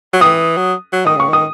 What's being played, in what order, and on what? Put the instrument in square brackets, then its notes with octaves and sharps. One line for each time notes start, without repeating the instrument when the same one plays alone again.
[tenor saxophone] F#3
[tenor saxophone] E3 [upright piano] D#6
[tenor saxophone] F#3
F#3
[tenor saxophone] D#3 [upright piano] D#6
[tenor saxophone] C#3 [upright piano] C#6
[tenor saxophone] D#3 [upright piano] D#6